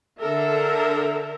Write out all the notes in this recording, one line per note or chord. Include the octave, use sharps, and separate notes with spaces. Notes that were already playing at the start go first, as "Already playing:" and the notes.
D3 A4 A#4 E5